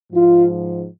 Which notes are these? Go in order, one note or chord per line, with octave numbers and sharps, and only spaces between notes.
G#2 F3 F4